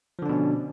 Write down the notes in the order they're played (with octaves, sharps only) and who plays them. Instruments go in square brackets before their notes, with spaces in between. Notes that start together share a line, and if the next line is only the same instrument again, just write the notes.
[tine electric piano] F3
D3
D4
B2
C#4